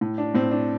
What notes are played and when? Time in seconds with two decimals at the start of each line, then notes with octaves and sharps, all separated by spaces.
0.01 A2
0.18 D4
0.34 A2 C4
0.51 D4